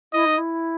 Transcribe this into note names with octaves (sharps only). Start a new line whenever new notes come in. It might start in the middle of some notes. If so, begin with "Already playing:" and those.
E4 D#5
D#4
E4